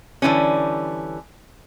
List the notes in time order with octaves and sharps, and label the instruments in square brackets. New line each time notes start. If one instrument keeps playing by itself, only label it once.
[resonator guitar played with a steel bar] D3 E3 G3 C#4